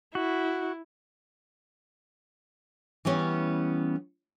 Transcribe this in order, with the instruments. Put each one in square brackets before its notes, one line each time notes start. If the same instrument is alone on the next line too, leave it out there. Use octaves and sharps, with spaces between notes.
[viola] E4 [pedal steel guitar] F#4
[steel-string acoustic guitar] E3 G3 B3 C#4